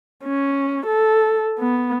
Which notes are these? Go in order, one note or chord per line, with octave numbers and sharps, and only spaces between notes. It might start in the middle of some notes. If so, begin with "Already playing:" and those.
C#4
A4
B3